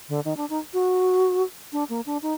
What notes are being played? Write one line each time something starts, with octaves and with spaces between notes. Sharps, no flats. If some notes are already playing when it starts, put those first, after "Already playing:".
D3
D#3
D4
D#4
F#4
D4
A#3
D4
D#4